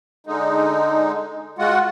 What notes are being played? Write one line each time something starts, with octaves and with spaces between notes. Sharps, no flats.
D3 G#3 D#4
G#3 F4 F#4 F#5